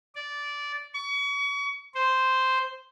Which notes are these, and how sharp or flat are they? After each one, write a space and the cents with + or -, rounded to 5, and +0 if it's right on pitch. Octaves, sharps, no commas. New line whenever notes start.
D5 -15
C#6 +35
C5 -5